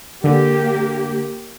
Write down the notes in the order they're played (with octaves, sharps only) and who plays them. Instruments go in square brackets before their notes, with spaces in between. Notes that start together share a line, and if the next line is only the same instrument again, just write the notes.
[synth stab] D3 [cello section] A#3 G4